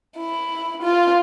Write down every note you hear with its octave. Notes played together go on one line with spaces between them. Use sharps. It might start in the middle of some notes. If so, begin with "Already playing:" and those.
E4
F4